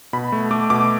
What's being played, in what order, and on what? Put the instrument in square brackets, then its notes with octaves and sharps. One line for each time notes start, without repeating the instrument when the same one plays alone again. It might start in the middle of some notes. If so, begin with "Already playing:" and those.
[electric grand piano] B2 B5
A3
A3 D6
B2 D6